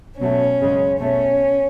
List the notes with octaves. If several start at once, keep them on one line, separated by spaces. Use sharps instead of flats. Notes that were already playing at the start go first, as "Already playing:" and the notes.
B2 F#3 A3 C#4
F#2 C#3 G#3
B2 A3 C#4